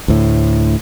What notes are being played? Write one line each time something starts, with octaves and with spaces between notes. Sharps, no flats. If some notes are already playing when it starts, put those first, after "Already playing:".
D2 A2